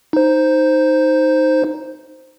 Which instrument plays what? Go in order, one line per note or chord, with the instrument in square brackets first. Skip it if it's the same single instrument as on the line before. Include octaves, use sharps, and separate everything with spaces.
[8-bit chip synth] D#4 C5